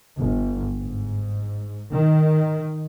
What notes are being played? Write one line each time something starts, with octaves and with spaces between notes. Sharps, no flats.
G1
G#2
D#3